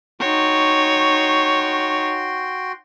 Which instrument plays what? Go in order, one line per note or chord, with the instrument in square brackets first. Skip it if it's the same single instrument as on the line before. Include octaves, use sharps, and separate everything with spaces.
[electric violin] D#4 C#5 [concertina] F#4 G5 C6